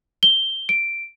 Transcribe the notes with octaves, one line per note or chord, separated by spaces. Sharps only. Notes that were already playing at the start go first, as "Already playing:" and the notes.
G7
D7